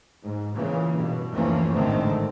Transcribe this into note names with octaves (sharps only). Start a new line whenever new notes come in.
G#2
A#2 C#3 E3 A#3
G2 B2
F#1 D2 E3 F3 A#3 C#4
A1 G#2 D3 D#3 A3 C4